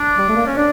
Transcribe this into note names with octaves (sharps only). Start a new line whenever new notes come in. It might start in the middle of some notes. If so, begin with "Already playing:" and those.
Already playing: D4
G3
A3
A#3
C#4
D4